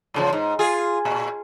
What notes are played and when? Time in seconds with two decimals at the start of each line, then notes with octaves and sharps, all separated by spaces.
0.14 G#2 C#3 F3
0.33 G#2
0.59 F4 G#4
1.05 A#2